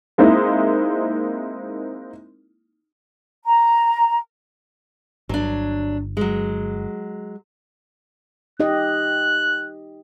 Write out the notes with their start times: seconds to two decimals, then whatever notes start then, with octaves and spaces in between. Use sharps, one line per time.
0.18 G#3 A#3 C4 D#4 E4
3.44 A#5
5.29 G1 F#3 D4
6.17 F#3 G#3
8.60 D#4 G4 D#5 F#6